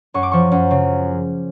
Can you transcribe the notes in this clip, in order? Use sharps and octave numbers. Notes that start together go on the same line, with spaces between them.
F#2 C#6
D6
F3 C#6
F#2
C#3